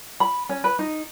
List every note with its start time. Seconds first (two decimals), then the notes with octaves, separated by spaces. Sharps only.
0.20 B5
0.49 C#4
0.64 B4
0.79 D#4